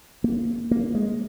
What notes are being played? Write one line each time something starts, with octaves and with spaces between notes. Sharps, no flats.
A#3
A#3
G#3